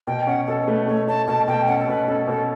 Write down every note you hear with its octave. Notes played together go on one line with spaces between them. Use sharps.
B2 G5
C#4 F#5
B2 A4
A4
A3 B4
A3 C#5
A3 A5
B2 A5
B2 G5
C#4 F#5
A4
B2 B4
C#4 A4
B2 A4